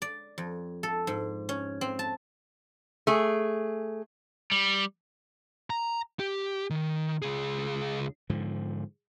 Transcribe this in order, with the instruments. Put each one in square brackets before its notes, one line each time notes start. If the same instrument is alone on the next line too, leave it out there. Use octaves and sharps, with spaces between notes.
[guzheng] D5
F2
A4
G#2
C#4
C4
A5
[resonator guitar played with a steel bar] A3 G#4
[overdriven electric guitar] G3
[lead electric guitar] A#5
G4
D#3
C#2 G#4
[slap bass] G#2 D3 F3